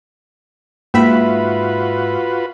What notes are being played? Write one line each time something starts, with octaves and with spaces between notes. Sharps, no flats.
G#2 A#3 F4 F#4 B4 E5 B5